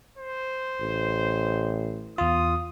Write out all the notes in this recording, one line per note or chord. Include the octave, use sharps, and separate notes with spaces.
C5
A1
E2 F4 D#6